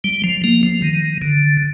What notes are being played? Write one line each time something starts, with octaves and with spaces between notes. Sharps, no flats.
G3
F3
A#3
F3
D#3
D3